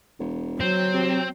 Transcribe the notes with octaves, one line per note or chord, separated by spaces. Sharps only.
E1
F#3 C4
C3